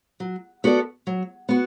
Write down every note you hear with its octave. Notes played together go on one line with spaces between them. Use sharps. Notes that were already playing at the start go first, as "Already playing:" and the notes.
F#3
B3 F#4 A4 D5
F#3
B3 F#4